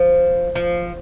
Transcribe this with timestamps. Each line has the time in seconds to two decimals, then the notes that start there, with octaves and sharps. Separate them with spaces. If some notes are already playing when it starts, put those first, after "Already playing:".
Already playing: F3
0.55 F3